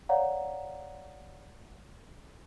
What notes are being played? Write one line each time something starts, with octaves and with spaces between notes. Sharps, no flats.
C#5 D5 F5 F#5 A#5